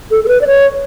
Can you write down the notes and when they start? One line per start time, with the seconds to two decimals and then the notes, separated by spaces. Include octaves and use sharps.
0.11 A4
0.24 A4
0.28 B4
0.41 D5
0.47 C#5